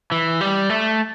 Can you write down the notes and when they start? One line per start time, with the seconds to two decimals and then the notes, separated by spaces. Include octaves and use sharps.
0.12 E3
0.41 G3
0.70 A3